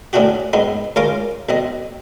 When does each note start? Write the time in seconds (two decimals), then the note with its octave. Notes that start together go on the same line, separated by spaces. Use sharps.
0.13 A2 C3 C#4 D4 F#4 G4
0.53 G#2 B3 C4 D#4
0.96 C#2 C#4 F4 A#4 F5 D6
1.49 B1 C4 D#5